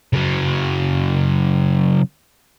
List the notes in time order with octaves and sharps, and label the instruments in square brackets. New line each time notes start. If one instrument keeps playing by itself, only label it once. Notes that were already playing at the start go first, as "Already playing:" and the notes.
[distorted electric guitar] C#3 F#3